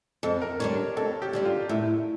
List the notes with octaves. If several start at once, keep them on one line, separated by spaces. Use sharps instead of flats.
F2 A4
A#4
D3 G3 D4 C#5
F2 A4
G4
D3 G3 D4
F4
A2 E4